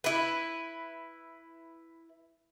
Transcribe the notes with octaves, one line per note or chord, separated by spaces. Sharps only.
E4 B4